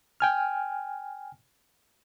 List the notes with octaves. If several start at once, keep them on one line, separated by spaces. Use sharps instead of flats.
G5 G#5 F6